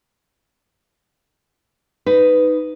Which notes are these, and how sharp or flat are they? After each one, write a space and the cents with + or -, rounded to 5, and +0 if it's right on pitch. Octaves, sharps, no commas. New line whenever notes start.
D#4 +0 B4 +15